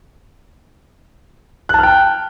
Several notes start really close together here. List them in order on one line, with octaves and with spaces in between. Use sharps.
F#6 A5 F6 G5